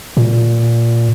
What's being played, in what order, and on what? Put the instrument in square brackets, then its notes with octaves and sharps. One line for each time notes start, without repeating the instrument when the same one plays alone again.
[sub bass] A#2